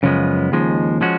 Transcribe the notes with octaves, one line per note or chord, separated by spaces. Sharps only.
F#2 C#3 F3 G#3 B3
D#2 C#3 F3 G#3
F3 G#3 C#4 F#4